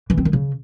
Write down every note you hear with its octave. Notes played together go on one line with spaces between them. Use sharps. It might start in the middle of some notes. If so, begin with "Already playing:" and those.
E3
C4
D#3
C#3